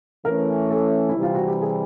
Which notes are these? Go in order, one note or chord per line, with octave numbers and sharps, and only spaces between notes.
E3 A3 C#4 A#4
A4
E4
C3 E3 G3
F4
F#4
G4
G#4